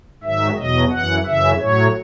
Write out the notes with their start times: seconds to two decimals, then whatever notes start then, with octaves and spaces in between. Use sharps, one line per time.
0.23 G#2 D#3 F#3 E5
0.57 E2 B2 F#3 D#5
0.91 F#2 E3 F#5
1.25 F#2 C#3 E3 E5
1.60 A2 F#3 C#5